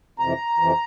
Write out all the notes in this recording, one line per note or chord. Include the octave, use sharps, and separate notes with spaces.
F2 C3 E3 A#5
F2 C3 E3